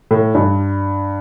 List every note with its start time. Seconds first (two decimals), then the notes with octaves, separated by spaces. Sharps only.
0.11 A2
0.35 G2